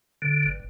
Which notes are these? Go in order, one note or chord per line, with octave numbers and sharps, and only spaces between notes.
D3
G1